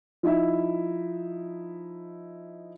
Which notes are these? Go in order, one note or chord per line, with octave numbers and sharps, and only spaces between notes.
F3 D#4 E4 E5